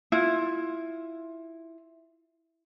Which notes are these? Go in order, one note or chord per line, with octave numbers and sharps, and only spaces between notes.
E4 F4